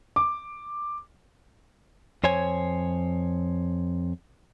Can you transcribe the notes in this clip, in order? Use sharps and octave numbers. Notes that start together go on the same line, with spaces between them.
D6
F2 C5 C#5 G#5